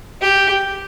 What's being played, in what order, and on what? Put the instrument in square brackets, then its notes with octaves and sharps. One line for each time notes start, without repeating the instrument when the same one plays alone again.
[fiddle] G4